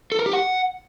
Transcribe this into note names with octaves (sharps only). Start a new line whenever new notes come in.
A4
A#4
G4
F#5